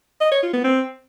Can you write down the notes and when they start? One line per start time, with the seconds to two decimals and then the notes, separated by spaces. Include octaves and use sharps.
0.21 D#5
0.31 C#5
0.42 F4
0.53 B3
0.64 C4